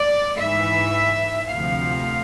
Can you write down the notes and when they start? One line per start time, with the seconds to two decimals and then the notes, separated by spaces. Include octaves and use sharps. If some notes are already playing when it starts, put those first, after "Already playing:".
Already playing: D5
0.39 G#2 E3 E5
1.50 D2 C3 F3 F5